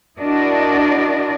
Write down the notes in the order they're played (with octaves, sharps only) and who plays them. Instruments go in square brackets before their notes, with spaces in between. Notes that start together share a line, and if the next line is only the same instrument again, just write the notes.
[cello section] D4 E4 F#4 A#4 D5 D#5